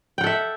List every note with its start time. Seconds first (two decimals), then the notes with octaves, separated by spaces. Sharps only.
0.18 G5
0.21 F#5
0.24 A4
0.27 E5